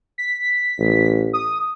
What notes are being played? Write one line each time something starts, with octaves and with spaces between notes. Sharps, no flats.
B6
A1
D#6